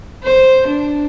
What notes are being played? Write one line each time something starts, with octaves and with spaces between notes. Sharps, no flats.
C5
D4